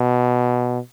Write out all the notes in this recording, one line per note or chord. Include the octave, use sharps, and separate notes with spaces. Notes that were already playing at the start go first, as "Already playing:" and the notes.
Already playing: B2